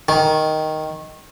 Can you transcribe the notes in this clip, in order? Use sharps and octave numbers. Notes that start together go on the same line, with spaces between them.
D#3